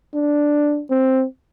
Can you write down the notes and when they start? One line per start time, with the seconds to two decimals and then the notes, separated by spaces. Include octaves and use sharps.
0.14 D4
0.90 C4